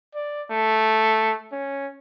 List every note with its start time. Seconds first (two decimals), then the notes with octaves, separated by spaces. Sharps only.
0.14 D5
0.51 A3
1.52 C#4